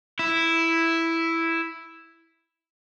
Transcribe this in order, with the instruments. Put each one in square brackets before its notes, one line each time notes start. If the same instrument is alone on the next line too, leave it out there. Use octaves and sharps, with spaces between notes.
[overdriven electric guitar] E4